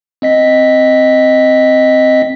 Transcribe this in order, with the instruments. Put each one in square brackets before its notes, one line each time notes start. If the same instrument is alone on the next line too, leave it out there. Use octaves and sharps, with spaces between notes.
[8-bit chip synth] C4 D#5 B6